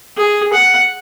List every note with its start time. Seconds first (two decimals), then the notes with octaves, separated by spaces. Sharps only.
0.18 G#4
0.53 F#5